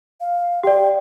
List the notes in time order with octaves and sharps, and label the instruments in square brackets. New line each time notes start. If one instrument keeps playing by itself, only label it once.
[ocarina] F5
[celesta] G4 D5 [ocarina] G5